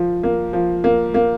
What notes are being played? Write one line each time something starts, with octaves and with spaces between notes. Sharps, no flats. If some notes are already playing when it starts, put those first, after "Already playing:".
Already playing: F3
A#3
F3
A#3
A#3